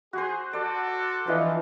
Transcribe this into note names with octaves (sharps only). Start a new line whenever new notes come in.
F#4 G#4 C5
F#4 A4 D5
E3 F3 D4 F4 D#5